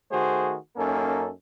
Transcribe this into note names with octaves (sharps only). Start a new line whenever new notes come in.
D#3 A3 F#4 G#4 C5
F#2 A#3 C#4 D#4 A4